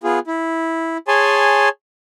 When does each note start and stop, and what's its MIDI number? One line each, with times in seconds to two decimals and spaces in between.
0.04 0.19 59
0.04 0.19 65
0.04 0.19 68
0.27 0.97 64
1.08 1.69 68
1.08 1.69 73
1.08 1.69 80
1.08 1.69 81
1.08 1.69 84